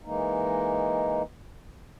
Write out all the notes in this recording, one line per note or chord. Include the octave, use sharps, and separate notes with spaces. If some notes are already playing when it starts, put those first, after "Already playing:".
E3 G#3 A#3 D#4